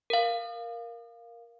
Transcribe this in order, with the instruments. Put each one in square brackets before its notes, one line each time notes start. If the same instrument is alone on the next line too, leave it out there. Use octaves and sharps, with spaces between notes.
[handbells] A#4 F5